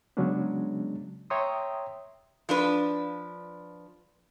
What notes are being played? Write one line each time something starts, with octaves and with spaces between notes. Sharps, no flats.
C#3 F#3 G#3 B3 C#4 D4
C#5 E5 G5 A#5 C6 D#6
F3 D4 B4